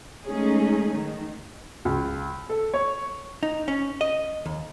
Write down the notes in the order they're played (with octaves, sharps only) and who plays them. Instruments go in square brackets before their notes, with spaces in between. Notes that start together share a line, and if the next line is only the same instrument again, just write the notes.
[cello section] G#3 A3 C#4 D#4 G#4
D#3
[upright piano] C#2
A4
C#5
[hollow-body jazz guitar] D#4
C#4
D#5
D#2